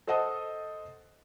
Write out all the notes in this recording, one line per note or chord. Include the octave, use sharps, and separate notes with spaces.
A4 C5 D#5 F#5 A5 D#6